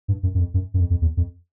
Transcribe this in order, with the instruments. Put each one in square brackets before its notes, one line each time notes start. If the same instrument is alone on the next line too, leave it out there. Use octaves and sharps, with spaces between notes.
[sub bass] G2
F#2
F#2
F2
F#2
F#2
F2
F2
E2
F2